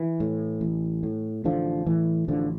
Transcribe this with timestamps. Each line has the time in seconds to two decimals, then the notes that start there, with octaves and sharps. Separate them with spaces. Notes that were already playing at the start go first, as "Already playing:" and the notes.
Already playing: E3
0.20 A2
0.61 A1
1.03 A2
1.44 A1 D3 F3
1.86 A2 E3
2.28 A1 D3 F3